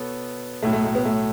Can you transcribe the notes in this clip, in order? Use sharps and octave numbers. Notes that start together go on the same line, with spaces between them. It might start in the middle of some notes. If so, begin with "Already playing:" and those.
Already playing: B2 B3 A4 C#5
B1 A2 F#3 A3
A3
A3
B3
A3